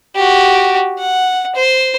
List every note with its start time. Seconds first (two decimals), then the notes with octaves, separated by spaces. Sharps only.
0.16 F#4 G4
0.98 F#5
1.55 C5